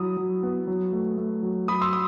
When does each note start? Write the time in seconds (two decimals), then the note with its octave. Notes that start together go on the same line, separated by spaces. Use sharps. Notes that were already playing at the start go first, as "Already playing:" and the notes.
Already playing: F#3 E4 D#6
0.17 F#3
0.43 B3
0.67 F#3
0.93 A3
1.17 A3
1.43 F#3
1.68 F#3 B5 D#6
1.82 C6 E6
1.93 D#6